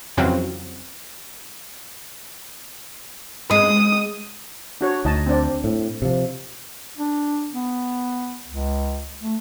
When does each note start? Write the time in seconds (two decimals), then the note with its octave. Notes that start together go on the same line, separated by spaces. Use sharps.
0.17 F2 C#3 E3 F#3 C4 F4
3.51 G#3 D#6
4.81 D4 F#4 C#5
5.05 D2 D#4 D#5 A5
5.27 C4 D4 D5
5.64 A2
6.02 C3 F3
6.98 D4
7.53 B3
8.46 C#2
9.21 A3